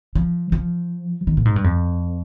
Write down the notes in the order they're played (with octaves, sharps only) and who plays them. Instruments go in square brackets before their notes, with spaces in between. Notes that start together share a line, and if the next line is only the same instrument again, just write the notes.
[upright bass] F3
F3
D#3
A#2
G#2
G2
F2